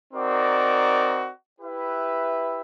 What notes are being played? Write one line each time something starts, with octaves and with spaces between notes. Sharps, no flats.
C4 D#4 F#4 A#4 D5
E4 G4 B4 E5